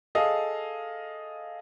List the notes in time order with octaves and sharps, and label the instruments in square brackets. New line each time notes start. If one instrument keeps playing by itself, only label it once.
[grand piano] G#4 A4 D#5 F5